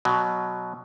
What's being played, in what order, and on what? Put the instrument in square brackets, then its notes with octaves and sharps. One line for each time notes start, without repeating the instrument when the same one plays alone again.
[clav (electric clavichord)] B2 F#3